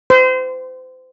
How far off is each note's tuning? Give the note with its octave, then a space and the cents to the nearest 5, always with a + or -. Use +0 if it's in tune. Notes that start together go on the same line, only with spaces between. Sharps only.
C5 -30